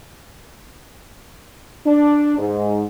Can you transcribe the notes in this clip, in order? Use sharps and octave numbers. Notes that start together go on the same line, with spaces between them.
D4
G#2